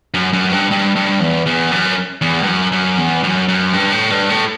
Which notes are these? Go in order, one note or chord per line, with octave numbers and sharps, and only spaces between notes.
F#2
F#2
G2
G2
G2
E2
E2
F#2
E2
G2
F#2
F#2
E2
F#2
F#2
G2
A2
G2
A2